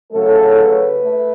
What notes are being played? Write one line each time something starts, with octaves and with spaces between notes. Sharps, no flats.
C#3 F#3 A3 A4
B4
A3